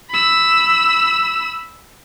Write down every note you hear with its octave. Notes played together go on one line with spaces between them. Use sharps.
B5 E6